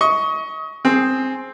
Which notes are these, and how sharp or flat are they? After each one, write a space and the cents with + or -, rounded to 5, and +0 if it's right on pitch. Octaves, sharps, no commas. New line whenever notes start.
D#5 +30 C#6 +10
C4 +5 G#4 +5